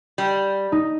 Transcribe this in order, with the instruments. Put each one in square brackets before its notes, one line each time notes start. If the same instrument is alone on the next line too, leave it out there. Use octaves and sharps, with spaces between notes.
[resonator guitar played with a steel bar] G3
[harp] D#4